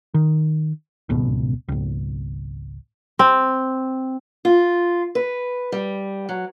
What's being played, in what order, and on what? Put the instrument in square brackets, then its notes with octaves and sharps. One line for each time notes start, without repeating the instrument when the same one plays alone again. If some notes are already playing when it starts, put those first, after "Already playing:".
[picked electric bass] D#3
D1 G#1 C#2 B2
G#1 C#2
[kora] C4
[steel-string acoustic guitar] F4
B4
G3
F#3